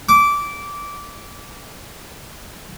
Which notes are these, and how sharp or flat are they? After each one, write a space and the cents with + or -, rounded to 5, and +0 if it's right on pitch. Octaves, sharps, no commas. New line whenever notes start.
D6 -15